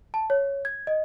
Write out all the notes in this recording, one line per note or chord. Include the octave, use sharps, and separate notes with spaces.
A5
C#5
G#6
D#5